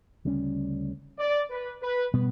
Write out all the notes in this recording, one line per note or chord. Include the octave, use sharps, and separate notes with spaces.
D2 C#3 G3 C#4
D5
B4
B4
B2 G3 B3